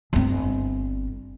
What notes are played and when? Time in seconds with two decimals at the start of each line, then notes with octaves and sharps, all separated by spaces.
0.13 G1 C4